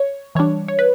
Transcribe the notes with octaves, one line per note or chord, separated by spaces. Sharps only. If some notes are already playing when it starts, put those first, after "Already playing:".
Already playing: C#5
E3 G3 D4 C#5
C#5
B4